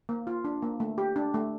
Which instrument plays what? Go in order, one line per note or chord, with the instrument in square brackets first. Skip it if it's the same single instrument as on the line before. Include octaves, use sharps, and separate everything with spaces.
[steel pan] A#3
F4
D4
A#3
A3
G4
D4
A3